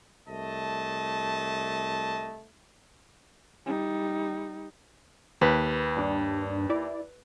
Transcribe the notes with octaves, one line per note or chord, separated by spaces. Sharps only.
C2 A3 D#5 A5
G3 D#4
D#2 B4
G2 D4
E4 D5